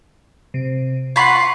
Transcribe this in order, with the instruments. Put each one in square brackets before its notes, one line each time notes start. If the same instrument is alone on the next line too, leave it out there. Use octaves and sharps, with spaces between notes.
[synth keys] C3
[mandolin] F4 B5 [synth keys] F#5 C#6 C7